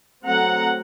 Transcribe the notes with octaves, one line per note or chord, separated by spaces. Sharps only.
F#3 A3 C4 F#5 A#5